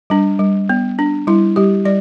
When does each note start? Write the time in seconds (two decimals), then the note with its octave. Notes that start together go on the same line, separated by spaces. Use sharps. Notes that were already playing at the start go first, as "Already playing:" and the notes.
0.10 G3 D4
0.39 G3
0.69 B3
0.99 D4
1.27 G3 E4
1.56 G3 G4
1.85 G3 D5